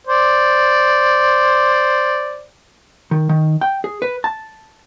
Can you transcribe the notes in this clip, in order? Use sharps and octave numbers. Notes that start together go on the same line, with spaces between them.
C5 D5
D#3
D#3
G5
G#4
B4
A5